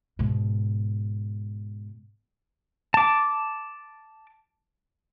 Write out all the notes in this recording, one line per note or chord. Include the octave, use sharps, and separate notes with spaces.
G#2 B2
A5 D6